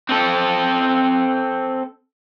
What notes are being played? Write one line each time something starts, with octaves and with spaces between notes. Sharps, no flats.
C4 A4